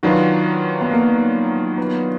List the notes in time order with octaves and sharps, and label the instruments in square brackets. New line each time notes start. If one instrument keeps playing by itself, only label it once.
[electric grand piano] D#3 F#3 D4 F4 B4 [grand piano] F#4
[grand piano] B3
A#3
B3